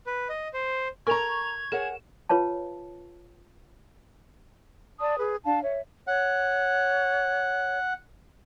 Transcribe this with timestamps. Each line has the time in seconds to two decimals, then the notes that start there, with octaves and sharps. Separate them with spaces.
0.06 B4
0.29 D#5
0.53 C5
1.07 A4 A#4 G#5 A#5 C#6 G#6 F7
1.72 G#4 A#4 C#5 F#5 E7
2.29 F4 B4 C#5 F5 A5
5.00 D5 A5 D#6
5.18 G#4 B4
5.45 D4 F5 A5
5.63 C#5 E5
6.07 C#5 F#5